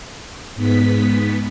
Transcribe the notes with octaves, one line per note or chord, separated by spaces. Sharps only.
G#2 B3 B6